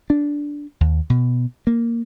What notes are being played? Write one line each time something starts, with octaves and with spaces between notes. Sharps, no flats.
D4
D#2
B2
A#3